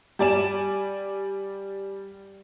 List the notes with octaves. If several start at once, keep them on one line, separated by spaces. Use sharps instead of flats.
G3 D5 G#5 E7